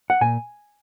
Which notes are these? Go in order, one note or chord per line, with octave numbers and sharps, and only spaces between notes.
F#5
A#2 G#5